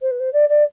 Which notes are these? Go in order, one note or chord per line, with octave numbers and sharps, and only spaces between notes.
C5
B4
C5
D5
D5